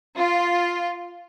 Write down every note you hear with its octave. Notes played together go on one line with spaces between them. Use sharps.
F4